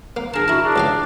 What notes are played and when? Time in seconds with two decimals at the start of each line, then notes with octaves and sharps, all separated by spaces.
0.17 A#3
0.34 D4 G#4 A#4 A5
0.48 E4 F#4 A5
0.64 D4 G#4
0.76 C#2 G4 F5